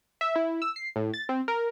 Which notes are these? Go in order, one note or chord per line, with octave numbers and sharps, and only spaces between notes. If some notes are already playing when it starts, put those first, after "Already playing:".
E5
E4
E6
C7
A2
A6
C4
A#4